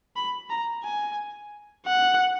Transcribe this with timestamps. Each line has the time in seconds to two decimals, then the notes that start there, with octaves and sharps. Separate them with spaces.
0.16 B5
0.50 A#5
0.84 G#5
1.87 F#5